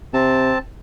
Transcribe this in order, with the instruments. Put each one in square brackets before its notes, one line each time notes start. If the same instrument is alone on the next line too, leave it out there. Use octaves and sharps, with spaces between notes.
[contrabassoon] C3 [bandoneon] C4 A5